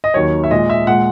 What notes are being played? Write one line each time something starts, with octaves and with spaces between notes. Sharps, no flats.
D#5
D#2 D#3 F#3 C#5
E5
A#2 G#3 D#5
E5
A#2 G#3 F#5